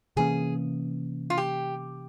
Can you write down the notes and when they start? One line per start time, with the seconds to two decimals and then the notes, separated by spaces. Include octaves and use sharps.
0.16 C3 E3 A#3 C#4 G#4
1.30 F4
1.38 G4